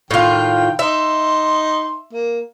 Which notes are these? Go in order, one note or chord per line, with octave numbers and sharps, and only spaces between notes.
A2 D#3 F4 G5
D#4 E5 C6
A#3